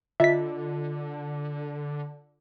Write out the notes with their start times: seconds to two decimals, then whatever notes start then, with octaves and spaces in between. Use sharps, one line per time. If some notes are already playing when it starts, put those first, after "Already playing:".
0.20 D3 F4 D#5 E5 B6